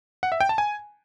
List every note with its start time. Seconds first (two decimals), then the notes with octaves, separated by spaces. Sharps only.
0.23 F#5
0.32 E5
0.41 G5
0.49 A5
0.58 G#5